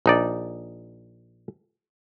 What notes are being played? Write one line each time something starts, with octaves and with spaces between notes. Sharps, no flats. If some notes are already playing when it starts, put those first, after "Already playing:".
A#1 D#4 D5